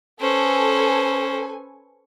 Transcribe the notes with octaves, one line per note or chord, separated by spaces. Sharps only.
C#4 A4 B4 C5 G#5